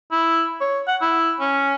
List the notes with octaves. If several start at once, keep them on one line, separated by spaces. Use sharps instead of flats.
E4
C#5
F#5
E4
C#4